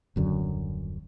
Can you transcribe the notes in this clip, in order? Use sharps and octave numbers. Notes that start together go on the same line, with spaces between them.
D#1 F#2 D3